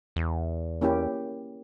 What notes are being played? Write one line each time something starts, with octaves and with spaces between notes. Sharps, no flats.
E2
A#3 C#4 E4 G4